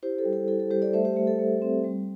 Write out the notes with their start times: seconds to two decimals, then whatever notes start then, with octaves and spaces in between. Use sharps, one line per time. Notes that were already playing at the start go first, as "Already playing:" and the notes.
0.03 E4 G4 C5
0.18 A4
0.25 G3
0.33 A4
0.48 E4 A4
0.60 A4
0.71 G3 G4 C5
0.82 A4 D5
0.93 A3 C5 E5
1.05 G4 C5
1.16 A3 G4
1.27 A4
1.39 A3
1.62 C4
1.84 G3